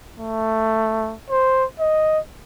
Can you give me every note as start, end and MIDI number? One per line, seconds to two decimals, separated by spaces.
0.18 1.16 57
1.30 1.64 72
1.80 2.19 75